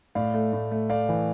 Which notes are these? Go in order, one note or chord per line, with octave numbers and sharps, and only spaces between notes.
A2 D5 F5
A3
A2
A3
A3 D5 F5
E3